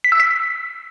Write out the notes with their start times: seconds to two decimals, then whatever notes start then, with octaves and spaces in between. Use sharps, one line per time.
0.04 B6
0.12 E6
0.20 B6